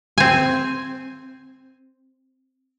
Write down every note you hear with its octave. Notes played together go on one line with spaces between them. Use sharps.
C4 G#5